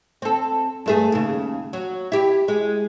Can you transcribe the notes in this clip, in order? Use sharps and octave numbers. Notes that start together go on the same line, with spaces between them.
C4 A4
G2 A3 G#4
D#2 C#3
F#3
E4 G4
G#3